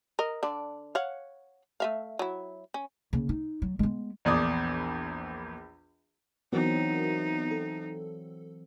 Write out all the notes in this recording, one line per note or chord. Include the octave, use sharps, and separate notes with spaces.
A#4 D#5
D3 D4
C#5 F5 F#5
A3 E5 F5
F#3 E4
C#4
C#3 A#3
D#4
F#3
G#3 B3
A#1 E2 D5 D#6
E3 F#3 B3 C4 D#4 F#4 A#4
A4